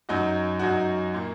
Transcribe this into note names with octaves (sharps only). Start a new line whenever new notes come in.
F#2 F#3 D#4 F#4
F#2 F#3 D#4 F#4
A#2 A#3